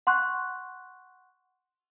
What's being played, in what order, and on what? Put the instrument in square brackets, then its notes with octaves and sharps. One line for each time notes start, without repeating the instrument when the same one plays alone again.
[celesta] F#5 C6 C#6 F#6